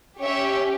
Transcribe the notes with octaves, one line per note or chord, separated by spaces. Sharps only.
C#4 G4 C#5 E5